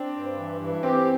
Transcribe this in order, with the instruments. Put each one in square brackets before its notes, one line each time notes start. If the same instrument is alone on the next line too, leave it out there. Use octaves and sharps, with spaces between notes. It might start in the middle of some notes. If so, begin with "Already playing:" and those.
Already playing: [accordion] C4 [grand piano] D4
[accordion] G2
E3
E3
[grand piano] C4 [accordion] G4